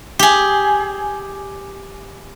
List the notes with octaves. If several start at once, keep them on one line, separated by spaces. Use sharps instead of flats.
G4 G#4